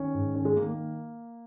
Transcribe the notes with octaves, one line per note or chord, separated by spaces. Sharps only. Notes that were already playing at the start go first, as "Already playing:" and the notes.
Already playing: D#3 C#4
G#2
D#3 C#4
G#3
D#3 A#3
A#3